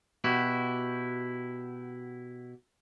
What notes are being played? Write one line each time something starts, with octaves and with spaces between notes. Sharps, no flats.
B2 E4 F#4 G4